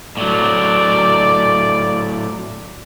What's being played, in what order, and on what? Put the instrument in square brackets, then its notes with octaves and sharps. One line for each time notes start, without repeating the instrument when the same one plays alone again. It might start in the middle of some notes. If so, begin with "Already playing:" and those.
[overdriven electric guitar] A2 F#3 [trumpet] D5